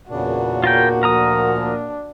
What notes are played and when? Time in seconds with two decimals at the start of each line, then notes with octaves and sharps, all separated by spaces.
0.10 E2 A#2 C#3 A#3 D4 F#4
0.64 F4 A#4 G5
1.03 D2 D3 F3 A#4 A#5 D#6
1.60 D4